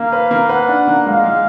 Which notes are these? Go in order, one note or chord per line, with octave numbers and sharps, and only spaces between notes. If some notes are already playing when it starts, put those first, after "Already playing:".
Already playing: A#3 F5
B4
A#3
B4 F#5
D4
A#3
G#3 F5
G#3